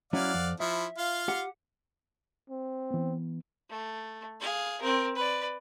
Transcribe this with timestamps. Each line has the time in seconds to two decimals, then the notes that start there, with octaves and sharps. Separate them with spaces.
0.13 F#3 C#4 E4 D5 F5 F#5
0.34 F2
0.60 F3 E4 E5
0.98 F4 F5
1.28 G4 F#5
2.49 C4
2.91 E3 B3
3.69 A3
4.40 G#4 F5
4.81 C4 A#4
5.16 B4 D5